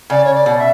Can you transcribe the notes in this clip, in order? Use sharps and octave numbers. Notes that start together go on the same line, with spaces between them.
C#3 D5
C#5
D5
B2
E5